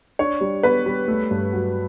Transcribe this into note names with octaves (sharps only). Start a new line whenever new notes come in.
D4 C#5
G3
B3 B4
G3
A3
G2
F#3